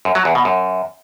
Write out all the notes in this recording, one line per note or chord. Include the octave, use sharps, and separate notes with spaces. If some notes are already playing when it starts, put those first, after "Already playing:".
F#2
F#3
E2
B2
F#2